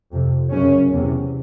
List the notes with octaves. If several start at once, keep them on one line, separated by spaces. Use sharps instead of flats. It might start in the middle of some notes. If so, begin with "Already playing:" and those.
F2 C3
F#2 C#3 C#4
E2 C3